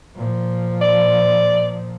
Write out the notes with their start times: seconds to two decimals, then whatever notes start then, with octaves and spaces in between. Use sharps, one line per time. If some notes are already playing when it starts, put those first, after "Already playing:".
0.16 A#2 F3
0.81 D5